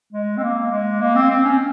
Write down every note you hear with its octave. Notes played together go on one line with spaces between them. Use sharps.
G#3
C4
A#3
G#3
A#3
C4
C4
C#4